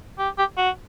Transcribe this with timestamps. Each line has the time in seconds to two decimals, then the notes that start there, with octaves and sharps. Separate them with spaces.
0.19 G4
0.38 G4
0.57 F#4